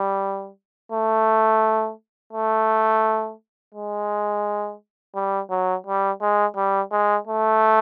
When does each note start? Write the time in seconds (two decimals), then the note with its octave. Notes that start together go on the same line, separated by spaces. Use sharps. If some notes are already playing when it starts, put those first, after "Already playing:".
Already playing: G3
0.92 A3
2.33 A3
3.75 G#3
5.15 G3
5.50 F#3
5.86 G3
6.21 G#3
6.56 G3
6.92 G#3
7.27 A3